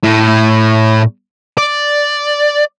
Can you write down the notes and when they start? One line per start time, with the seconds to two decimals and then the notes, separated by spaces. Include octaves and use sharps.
0.03 A2
1.58 D5